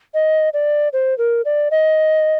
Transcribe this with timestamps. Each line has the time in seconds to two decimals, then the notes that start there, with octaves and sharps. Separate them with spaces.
0.14 D#5
0.53 D5
0.93 C5
1.18 A#4
1.45 D5
1.71 D#5